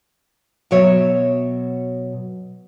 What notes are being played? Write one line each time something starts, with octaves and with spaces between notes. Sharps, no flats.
B2 F#3 C#5 E5